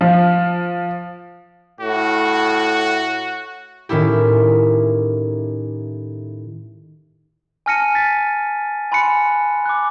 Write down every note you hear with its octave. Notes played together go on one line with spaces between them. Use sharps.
F3
A2 F#4
A2 D#3 C#4 E4 G4
G#5 A5 F6 A#6 C#7 D#7
A6 B6
G#5 B5 C6 F#6 C#7
D6 F#6